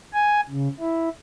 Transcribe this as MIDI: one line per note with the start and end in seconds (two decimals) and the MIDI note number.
0.14 0.41 80
0.50 0.68 49
0.80 1.09 64